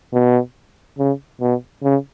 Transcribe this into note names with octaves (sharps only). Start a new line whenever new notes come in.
B2
C#3
B2
C#3